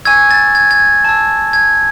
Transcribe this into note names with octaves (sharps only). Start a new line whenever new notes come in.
G#5 C#6 E6 G#6
A6
G#6
G#6
A5 E6
G#6